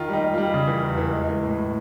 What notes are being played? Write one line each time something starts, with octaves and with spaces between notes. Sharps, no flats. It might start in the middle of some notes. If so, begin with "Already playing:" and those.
Already playing: D#3 F4
G3 D#4
G3
G3 F4
C#3
E3
E2
E3
G#3
E3
A2
A2